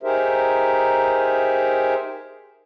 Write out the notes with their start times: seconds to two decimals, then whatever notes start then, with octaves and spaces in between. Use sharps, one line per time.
0.03 D#4 G4 G#4 A#4 C5 E5